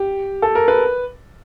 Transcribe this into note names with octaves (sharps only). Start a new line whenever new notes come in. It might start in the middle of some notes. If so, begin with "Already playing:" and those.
Already playing: G4
A4
A#4
B4